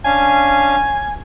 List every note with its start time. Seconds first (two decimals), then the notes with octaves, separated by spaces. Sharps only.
0.05 C#4 D4 F5 G#5